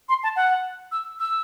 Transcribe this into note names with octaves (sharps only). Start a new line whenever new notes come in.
C6
A5
F#5
E6
E6